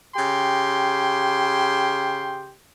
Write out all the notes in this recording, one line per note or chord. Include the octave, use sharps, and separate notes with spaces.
C#3 G4 G5 C6